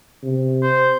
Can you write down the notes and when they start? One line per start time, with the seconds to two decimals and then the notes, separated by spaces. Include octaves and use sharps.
0.23 C3
0.62 C5